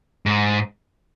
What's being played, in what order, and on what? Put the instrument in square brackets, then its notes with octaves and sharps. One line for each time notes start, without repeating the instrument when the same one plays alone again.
[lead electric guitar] G#2